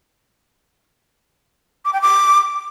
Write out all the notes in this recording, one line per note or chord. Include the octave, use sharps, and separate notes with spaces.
D6
G5
D6